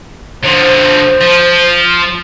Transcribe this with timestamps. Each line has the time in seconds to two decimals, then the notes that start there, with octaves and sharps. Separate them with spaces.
0.44 D3 F3 C5
1.21 F3